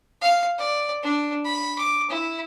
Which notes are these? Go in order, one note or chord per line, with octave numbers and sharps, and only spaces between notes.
F5
D5
D4
B5
D6
E4